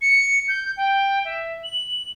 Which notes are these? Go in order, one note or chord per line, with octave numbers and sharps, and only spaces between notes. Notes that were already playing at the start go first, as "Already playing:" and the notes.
C#7
G6
G5
E5
F#7